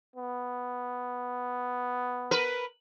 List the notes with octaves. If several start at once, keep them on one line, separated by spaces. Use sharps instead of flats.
B3
A#4 B4